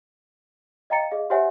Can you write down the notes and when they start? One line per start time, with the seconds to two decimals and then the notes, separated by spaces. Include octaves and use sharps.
0.90 D#5 F5 G5 A#5 A6 C#7
1.11 G#4 D#5 F5
1.30 G4 C5 C#5 E5 F#5 G#5